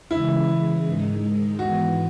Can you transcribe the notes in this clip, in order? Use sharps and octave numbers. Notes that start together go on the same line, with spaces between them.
C#3 E3 G#3 E4
G#2 D#3 G#3 D#4
G#2 E3 B3 F#4